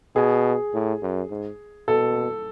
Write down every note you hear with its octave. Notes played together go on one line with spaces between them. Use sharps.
B2 G#4
A2
F#2
G#2
B2 A4